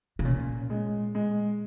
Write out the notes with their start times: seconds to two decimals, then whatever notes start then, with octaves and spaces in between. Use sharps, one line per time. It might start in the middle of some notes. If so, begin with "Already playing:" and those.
0.19 C#3
0.25 A#2 C#4
0.70 G#3
1.15 G#3